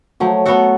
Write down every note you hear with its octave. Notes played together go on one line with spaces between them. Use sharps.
F3 F#3 A3
B3 F#4 A4